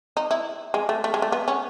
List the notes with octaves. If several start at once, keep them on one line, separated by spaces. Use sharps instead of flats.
D#4
E4
G#3
A3
A3
G#3
A3
B3
C#4